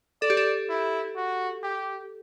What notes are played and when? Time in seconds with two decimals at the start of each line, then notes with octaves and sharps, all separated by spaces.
0.22 A4 D5
0.30 G4
0.37 A4
0.69 E4
1.16 F#4
1.63 G4